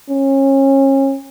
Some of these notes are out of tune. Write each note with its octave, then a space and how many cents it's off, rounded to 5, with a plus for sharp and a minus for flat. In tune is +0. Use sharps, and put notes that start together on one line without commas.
C#4 -30